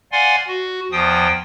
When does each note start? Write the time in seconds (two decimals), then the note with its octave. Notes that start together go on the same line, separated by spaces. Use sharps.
0.12 D5 F5 F#5 G#5 C6
0.48 F#4
0.92 E2 F3 G5 D#6